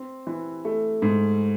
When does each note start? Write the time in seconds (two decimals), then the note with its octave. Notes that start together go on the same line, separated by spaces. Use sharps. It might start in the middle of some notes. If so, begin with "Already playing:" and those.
Already playing: C4
0.27 E3
0.65 A3
1.02 G#2